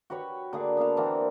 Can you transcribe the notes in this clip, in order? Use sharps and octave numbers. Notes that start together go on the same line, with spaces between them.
F#4 G4 B4 C#5
D3 A#3 G#4
B3 D4 F5 A5
E3 A#3 C4 D4